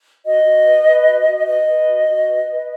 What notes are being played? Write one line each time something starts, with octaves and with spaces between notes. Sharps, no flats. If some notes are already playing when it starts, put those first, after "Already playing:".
F#4 D#5
F#4
B4
B4
F#4
F#4
B4 D#5
B4
F#4
F#4
B4
B4